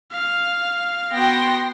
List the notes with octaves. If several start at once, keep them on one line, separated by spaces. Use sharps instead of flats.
F5
B3 F#4 G5 C6 A#6